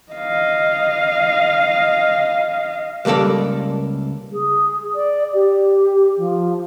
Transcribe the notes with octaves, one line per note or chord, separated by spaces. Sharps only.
D#5 F5
C#2 G3 A#3 A4 D5
G#4
D5
G4
F3